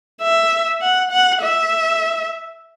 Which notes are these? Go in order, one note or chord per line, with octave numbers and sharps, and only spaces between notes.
E5
F#5
F#5
E5